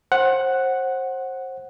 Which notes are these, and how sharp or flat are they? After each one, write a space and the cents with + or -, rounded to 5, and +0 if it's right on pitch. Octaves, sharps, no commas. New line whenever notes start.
C5 +30 F#5 +0